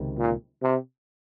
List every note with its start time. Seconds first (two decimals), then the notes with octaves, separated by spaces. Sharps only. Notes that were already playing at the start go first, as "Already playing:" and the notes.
Already playing: C#2 C3 D#3
0.18 A#2
0.62 C3